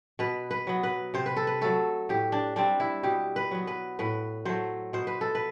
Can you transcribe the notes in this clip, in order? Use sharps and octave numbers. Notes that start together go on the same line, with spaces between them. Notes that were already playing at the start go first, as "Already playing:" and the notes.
B2 B4
B4
F#3 B3
B4
C3 C5
B4
A4
B4
F#3 A3 A4
A2 G4
D4
G3 C4 D4
E4
B2 G4
B4
F#3 B3
B4
A2 B4
F#3 A3 C5
B2 C5
B4
A4
B4